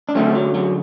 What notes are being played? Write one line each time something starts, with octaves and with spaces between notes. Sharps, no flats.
D4
F#2 D3 A3 C4
F#3
F#3